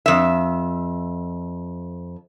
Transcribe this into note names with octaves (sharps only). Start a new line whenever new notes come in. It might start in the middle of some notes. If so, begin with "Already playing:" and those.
F2 E5